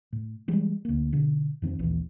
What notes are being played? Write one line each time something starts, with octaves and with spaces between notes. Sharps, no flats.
A2
E3 G3 G#3
D2 A#3
B2 D3
F2 D#3 C4
A#1 D#2 E3